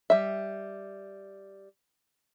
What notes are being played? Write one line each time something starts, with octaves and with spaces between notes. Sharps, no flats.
G3 E5